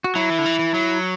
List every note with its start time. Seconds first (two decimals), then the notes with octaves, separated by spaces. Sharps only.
0.04 F#4
0.15 F#3 E4
0.30 E3
0.38 D3
0.45 E3
0.59 E3
0.74 F#3